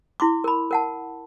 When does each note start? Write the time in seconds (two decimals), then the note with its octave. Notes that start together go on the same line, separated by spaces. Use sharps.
0.20 E4 C6 D6
0.44 A#4 B5
0.71 A#4 F#5 A5